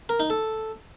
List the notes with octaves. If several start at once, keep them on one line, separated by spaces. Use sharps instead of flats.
A#4
D#4
A4